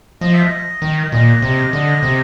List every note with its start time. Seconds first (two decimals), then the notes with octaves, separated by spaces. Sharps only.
0.21 F3 D#5
0.33 E5
0.44 D#5
0.82 D#3
1.12 A#2 D#5
1.42 C3
1.73 D3
2.03 C3